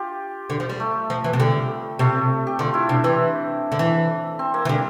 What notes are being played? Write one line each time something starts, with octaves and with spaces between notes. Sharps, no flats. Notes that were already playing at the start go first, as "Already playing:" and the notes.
Already playing: F4 G4
D3
F3
G3
A3
F3
E3
C3
D3 G3
C3 A3
G4
D3 F4
E4
C3 D4
E3 C4
D3
E3
C4
A#3
E3
D3 G3